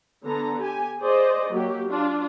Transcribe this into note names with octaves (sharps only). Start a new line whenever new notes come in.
D3 B3 A4 A#5
G4 G#5
G#4 C5 D5 D#5
F#3 A#3 G4
D4 F4